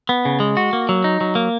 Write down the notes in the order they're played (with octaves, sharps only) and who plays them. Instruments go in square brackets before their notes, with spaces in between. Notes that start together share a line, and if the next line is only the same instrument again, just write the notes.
[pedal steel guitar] B3
C#3
G#3
F#4
A#3
F#3
D#4
F#3
A#3